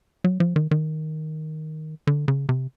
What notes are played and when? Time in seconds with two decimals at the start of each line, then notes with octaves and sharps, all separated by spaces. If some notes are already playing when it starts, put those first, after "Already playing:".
0.24 F#3
0.40 F3
0.56 D#3
0.71 D#3
2.07 D3
2.28 C#3
2.49 C3